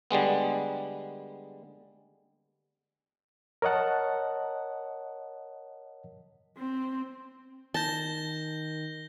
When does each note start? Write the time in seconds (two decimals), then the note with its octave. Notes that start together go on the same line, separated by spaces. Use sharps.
0.11 D3 G3 G#3 B3
3.62 A#4 C#5 D#5 F#5 A5
6.58 C4
7.74 D#3 A5 G6 A#6 G7